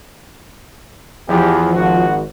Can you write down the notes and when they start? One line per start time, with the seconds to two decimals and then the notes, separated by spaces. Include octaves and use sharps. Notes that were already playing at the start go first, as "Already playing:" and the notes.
1.28 E2 F3 G4
1.74 G#1 F#4